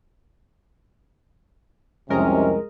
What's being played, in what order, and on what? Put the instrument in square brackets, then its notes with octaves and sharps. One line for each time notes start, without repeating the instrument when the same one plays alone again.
[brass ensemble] C2 F2 C3 [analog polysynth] G#3 A#4 D#5 [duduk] C#4